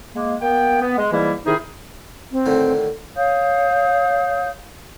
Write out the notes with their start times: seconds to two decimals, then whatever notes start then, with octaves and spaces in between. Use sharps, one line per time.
0.15 G#3 A#3
0.42 A#3 B3 G5
0.81 B3
0.98 G#3
1.12 G#2 E3 G3 A#3 E4
1.46 C3 D#3 D#4 E4 G#4
2.32 C4
2.46 A2 D3 D#3
3.16 C#5 F5 D#6 G6